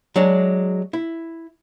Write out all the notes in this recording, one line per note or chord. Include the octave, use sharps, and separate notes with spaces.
F#3 G#3 D4
E4